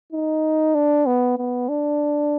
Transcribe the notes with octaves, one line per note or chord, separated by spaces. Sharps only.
D#4
D4
B3
B3
D4